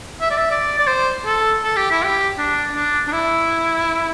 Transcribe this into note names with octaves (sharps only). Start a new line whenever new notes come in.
E5
D5
E5
D5
D5
C5
A4
A4
G4
E4
G4
D4
D4
D4
E4